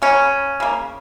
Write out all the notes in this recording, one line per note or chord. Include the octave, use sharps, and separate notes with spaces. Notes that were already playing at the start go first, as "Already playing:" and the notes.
C#3 A#3 C#4
C#3 A#3